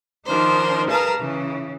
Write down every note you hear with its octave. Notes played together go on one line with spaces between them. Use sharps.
D#3 F3 D4 D#4 A#4 C5
G#4 A#4 B4 F5 A5 A#5
C#3 E3